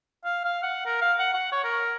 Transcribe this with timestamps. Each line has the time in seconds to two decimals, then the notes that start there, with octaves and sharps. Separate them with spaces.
0.25 F5
0.45 F5
0.63 F#5
0.86 A#4
1.02 F5
1.19 F#5
1.34 F#5
1.52 C#5
1.64 A#4